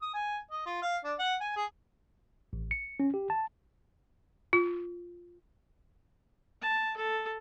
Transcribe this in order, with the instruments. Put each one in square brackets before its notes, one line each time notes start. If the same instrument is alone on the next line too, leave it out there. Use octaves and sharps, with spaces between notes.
[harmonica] D#6
G#5
D#5
F4
F5
D4
F#5
G#5
G#4
[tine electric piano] A1
C#7
C#4
G4
A5
[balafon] F4
[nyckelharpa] A5
A4